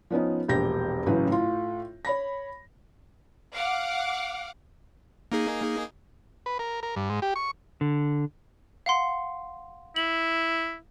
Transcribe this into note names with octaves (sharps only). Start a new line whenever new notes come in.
F3 B3 C#4 D#4
E1 A#1 G4 G6 A#6
A1 A2 C#3 F#3 C#4 B4
A2 F4
C#5 B5 A#6
F5 F#5 D6
A#3 D#4 G#4
B4
A#4
A#4
G2
G#2
G4
C#6
D3
F5 F#5 C6
E4 F#7